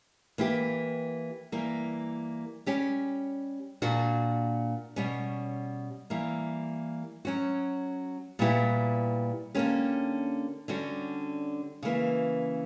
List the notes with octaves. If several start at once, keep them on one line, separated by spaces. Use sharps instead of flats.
E3 A#3 E4 G4
E3 G3 A#3
G3 C#4 G4
A#2 A#3 D4 F#4
B2 G3 C#4
E3 G3 A#3
F#3 C#4 F#4
A#2 G3 B3 E4 G4
D3 A#3 C#4 G4
D3 G3 C#4 F#4
C#3 E3 A#3